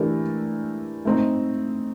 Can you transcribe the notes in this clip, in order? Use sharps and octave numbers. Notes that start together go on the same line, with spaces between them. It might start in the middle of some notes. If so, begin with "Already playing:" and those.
Already playing: E3 A3 D4 G4 A#4
A3 C4 D#4